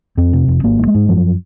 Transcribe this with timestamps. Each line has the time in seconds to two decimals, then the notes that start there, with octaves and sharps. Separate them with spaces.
0.17 F2 C4
0.33 C3
0.48 F1
0.63 G#1 A#3
0.79 G#2
0.87 G#3
0.95 G#2
1.09 F#2 F3